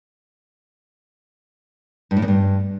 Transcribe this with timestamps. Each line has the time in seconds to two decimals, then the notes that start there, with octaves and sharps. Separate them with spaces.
2.11 G2
2.17 A2
2.22 E2
2.28 G2